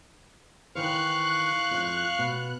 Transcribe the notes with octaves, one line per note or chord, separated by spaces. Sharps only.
D#3 E3 C5 F5 C#6 F#6
F2 F4
B2